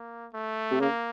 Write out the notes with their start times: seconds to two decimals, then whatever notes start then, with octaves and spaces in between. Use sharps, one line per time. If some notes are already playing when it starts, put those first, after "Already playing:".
Already playing: A#3
0.33 A3
0.71 C3
0.80 C#3 A#3